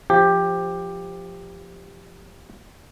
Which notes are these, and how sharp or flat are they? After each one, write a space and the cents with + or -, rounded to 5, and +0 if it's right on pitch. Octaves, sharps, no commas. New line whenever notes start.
F3 +0 G4 +10